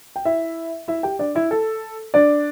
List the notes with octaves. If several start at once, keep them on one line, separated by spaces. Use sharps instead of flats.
G5
E4 E5
E4 E5
G4 G5
D4 D5
E4 E5
A4
D4 D5